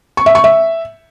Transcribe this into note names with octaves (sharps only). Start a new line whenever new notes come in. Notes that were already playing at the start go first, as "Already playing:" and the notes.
C#6
E5
C#6
E5